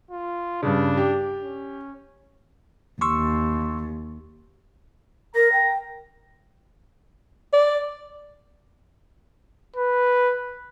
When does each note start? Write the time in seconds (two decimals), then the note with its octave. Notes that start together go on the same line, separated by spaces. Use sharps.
0.11 F4
0.63 G2 C#3 D4
0.97 G4
1.44 C#4
3.01 D#2 C6 C#6 E6
5.35 A#4 A#5
5.52 G5
7.53 D5
9.76 B4